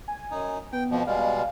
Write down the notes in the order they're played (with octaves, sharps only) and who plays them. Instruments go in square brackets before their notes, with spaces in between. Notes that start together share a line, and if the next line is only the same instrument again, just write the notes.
[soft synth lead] G#5
[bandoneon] F#2 D#4
[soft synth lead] B3 [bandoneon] G5
[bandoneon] F2 B2 F3
[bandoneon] B2 G3 G#3 [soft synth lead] F5